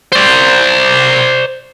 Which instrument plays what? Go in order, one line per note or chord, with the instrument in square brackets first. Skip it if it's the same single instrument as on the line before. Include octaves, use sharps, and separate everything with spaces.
[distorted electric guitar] C5 D5